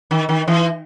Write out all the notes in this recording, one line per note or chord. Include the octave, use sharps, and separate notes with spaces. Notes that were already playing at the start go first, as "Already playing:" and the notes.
D#3
D#3
E3